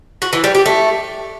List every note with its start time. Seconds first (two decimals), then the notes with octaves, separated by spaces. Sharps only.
0.22 F#4
0.33 E3
0.44 G3
0.55 G4
0.66 A3